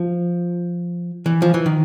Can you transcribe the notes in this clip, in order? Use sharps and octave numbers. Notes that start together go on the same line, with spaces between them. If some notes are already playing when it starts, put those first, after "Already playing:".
Already playing: F3
E3
F3
E3
D#3